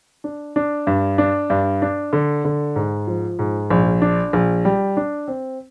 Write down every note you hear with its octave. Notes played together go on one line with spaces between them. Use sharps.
D4
D4
G2
D4
G2
D4
D3
D3
G#2
F3
G#2
A#1
D4
A#1
G3
D4
C4